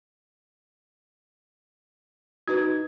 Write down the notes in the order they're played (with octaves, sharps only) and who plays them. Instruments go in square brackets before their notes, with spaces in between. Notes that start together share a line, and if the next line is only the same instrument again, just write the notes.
[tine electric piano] D#4 G#6 [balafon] F#4 B4